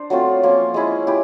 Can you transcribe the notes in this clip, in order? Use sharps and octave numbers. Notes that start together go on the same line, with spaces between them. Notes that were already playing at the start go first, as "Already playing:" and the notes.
Already playing: D4 C5
F#3 A3 C4 F4
F3 A#3 C#4 F4
G#3 C#4 E4 G#4
E4 G4